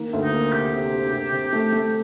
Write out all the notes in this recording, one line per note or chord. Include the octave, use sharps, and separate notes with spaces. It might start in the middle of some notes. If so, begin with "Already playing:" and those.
Already playing: D#3 A#3
D2
D#4
A#3
C3 G4
C3
C3
C3
C3
A3
A3